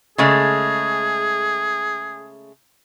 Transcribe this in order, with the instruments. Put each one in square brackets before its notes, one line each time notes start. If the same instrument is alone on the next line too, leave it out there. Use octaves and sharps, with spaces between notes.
[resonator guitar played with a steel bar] C#3 G#3 A3 [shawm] G#4